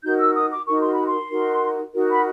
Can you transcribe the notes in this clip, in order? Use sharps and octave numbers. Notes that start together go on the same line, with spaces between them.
D#4 F#4 A#4 G6
E6
D#6
D6
D#4 F#4 A#4 C#6
C6
B5
C6
D#4 F#4 A#4
D#4 F#4 A#4
B5